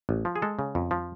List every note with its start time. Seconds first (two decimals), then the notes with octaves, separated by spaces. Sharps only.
0.09 A1
0.25 F3
0.36 G#4
0.42 G#3 A4
0.59 C#3
0.75 F2
0.91 F3